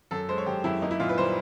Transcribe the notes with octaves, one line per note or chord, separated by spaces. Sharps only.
F#2 A4
G#3 C5
C#5
F#2 G4
F#2 E4
A#3 D#4
E4
A#2 F4
B4
G3 C5